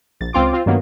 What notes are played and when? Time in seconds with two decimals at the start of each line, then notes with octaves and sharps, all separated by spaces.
0.20 A#1 A6
0.33 C#2 C4 F4 D6
0.53 C4 F4
0.66 G2 D#3 F#3 A#3 B3